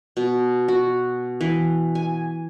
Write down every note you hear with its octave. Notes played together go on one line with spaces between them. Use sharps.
B2
F#4
E3
G#5